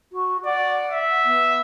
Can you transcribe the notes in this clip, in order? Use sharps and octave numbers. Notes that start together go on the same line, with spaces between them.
F#4
D5 F#5
E5
B3